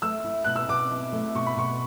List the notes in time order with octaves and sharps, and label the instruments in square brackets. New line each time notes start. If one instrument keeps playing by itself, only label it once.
[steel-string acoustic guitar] A3 [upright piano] E6
[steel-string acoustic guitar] E4
[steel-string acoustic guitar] B2 [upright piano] F#6
[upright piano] E6
[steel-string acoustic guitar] B2 [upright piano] D6
[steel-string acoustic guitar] E4
A3
[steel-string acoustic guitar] B2 [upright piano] C#6
[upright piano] B5
[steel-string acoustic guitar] B2 [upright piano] C#6